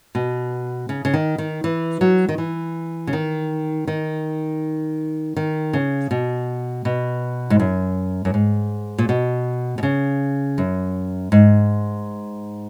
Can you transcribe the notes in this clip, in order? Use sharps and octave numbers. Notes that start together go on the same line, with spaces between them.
B2
C#3
C#3
D#3
D#3
E3
F#3
D#3
E3
C#3
D#3
D#3
D#3
C#3
B2
B2
G#2
F#2
F#2
G#2
A#2
B2
B2
C#3
F#2
G#2